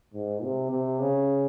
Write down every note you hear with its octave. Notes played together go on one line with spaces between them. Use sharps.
G#2
C3
C3
C#3